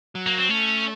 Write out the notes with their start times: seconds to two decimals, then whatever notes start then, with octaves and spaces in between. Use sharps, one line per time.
0.15 F#3
0.26 A#3
0.38 C4
0.50 A3 C#4